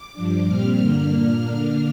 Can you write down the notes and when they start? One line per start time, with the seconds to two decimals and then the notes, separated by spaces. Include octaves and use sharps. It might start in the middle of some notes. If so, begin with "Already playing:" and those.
Already playing: D6
0.13 G2 F3 D4
0.47 A#2 G3 C4 F6
0.79 G2 D3 A#3 D4
1.11 A#2 A#3 D4 F6
1.44 D3 A#3 D4